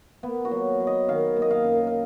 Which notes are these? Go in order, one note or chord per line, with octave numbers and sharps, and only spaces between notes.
A#3 B3
F#4
F#3
F#3
D#5
D#3 F5
A#3
D#5
F5
F#2
F5